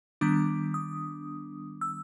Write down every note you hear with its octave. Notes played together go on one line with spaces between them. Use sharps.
D#3 G3 B3 D4 D6
D#6
E6